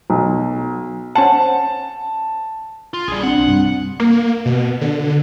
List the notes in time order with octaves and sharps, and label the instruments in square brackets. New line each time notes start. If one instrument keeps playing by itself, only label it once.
[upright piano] B1
[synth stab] C#4 C5 F#5 [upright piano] A5
[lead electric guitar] F4
[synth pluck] A#1 [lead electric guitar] G3 G#4
[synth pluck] C4 D4 [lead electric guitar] F#5
[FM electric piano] B1
G2 C3
[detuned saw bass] A#3
B2
D3